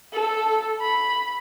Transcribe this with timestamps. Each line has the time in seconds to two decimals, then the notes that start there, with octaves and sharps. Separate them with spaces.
0.13 A4
0.81 B5